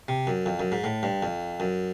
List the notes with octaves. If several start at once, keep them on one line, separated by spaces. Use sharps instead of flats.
C3
F#2
F2
F#2
G#2
A2
G2
F2
F#2